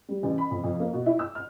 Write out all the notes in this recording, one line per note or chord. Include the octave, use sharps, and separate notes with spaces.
G3
A1
B5
F2
F2
A#3
B2
E4
E6
F6